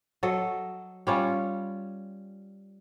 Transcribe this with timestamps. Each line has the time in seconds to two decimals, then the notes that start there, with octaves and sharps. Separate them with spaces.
0.23 F#3 A4 D#5
1.07 G3 C#4 F4